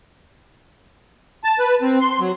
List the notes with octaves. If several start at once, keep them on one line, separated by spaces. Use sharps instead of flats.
A5
B4
C4
C6
F#3